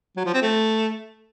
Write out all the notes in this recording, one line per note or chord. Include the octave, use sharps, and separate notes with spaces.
F#3
F3
C4
A3